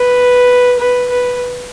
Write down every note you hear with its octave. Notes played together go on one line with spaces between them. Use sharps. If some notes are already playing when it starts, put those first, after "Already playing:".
Already playing: B4
B4
B4